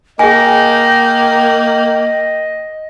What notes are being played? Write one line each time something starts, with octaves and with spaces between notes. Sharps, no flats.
A#3 G#4 D#5 G5 G#5